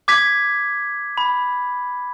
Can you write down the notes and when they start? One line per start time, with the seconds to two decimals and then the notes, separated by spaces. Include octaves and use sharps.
0.08 D6 G#6 B6
1.18 B5